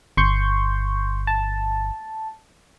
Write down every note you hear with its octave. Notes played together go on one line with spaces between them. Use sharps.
G1 C6 C#6 G6
A5